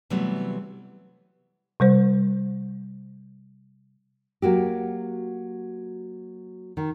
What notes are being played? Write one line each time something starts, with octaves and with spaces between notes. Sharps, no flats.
C3 E3 F#3 G3 A3 B3
C3 G3 C5
F#3 A#3 F#4 G4
D#3